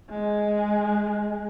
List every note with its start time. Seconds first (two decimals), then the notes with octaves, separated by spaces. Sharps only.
0.10 G#3